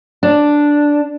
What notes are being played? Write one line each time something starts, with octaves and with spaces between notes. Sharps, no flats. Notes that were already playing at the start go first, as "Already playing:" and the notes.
D4